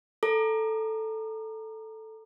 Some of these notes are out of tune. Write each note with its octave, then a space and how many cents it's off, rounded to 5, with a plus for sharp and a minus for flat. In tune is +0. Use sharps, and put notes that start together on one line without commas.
A4 +0 A#5 +0 D6 +45